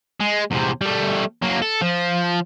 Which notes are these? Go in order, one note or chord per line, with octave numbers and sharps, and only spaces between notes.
G#3
E2 C3
G3 A3
F#3 A#3
A4
F3